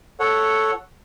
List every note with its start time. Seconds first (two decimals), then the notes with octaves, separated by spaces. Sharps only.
0.20 A4 C#5 F#5